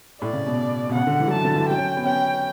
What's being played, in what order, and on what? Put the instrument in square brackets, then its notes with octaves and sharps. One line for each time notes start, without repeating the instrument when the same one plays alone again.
[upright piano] A2 [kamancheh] D5
[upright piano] C#3
B2
B2
[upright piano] C#3 [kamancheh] F#5
[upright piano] D3
E3
F#3
[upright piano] E3 [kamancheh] A5
[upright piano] D3
E3
[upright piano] F#3 [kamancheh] G5
[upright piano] C#4
B3
[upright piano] C#4 [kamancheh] G5